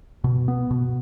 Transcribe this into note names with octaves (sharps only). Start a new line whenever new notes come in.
B2
B3
B2